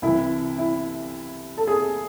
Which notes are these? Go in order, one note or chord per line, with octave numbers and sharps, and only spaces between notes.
C2 C3 E3 E4
E4
A4
G#4